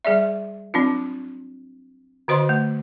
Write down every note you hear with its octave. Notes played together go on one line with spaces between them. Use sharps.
G3 G#4 D5 E5
F#3 C4 D4 F4
D3 F#4 C5 D#5 C6
A3